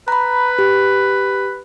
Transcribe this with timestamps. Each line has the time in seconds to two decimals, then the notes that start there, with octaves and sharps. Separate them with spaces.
0.08 B4 A#5 B5
0.58 G4